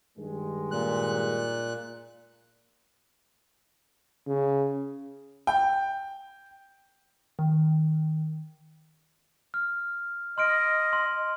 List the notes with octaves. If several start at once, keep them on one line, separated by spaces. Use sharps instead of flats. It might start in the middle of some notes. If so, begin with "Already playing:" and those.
G2 D#3 G#3
A#2 F#6
C#3
G5
D#3
F6
D#5 C6 F6 D7
C6